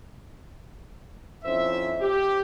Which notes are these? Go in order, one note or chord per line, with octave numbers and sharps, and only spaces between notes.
F2 C#4 E4 C5 E5
G4